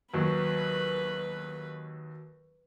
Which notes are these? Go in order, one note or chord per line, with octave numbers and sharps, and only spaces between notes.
D#2 F#3 B4